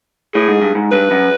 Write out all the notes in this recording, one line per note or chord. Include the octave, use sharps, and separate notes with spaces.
A2 G#4
G#2
G2
G#2
G2 B4
F#2